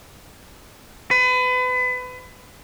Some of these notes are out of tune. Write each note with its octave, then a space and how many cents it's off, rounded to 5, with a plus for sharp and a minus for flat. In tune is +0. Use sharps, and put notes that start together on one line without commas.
B4 +30